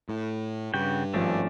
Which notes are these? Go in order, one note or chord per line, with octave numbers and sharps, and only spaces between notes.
A2
G2 C#3 F#4 G5
G#1 F3 A3 C#4 D4